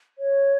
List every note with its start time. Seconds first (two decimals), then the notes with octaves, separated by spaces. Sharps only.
0.19 C#5